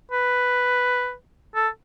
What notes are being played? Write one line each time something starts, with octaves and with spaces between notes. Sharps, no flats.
B4
A4